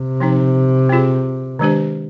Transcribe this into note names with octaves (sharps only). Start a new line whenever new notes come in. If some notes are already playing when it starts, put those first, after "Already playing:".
Already playing: C3
F3 C4 D#4
C4 F4 G#4
D#3 G#3 D4 G4 C5